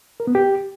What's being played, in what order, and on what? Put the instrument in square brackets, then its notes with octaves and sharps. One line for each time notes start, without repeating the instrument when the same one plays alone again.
[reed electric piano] A#4
B3
G4